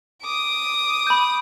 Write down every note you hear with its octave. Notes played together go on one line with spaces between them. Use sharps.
D6 D#6
B5 G6